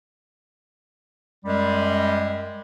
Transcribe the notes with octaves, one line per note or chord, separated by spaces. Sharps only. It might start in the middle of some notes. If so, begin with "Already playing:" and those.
F#2 G3 G#3